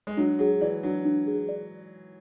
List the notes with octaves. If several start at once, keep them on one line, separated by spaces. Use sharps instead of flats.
G#3
F#3 D4
F#3 G#4
E3 D5
F#3 D4
D4
G#4
D5